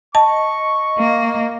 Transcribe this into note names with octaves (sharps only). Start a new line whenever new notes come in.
D#5 A5 C#6
A#3